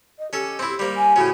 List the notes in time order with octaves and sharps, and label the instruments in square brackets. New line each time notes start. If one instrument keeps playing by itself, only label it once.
[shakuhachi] D#5
[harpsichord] C#4 A4 [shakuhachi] G4
[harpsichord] C4 E4
[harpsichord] G3 A#3 [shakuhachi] C5
[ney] G#5
[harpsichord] A2 C#3 C#4 [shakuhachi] F#4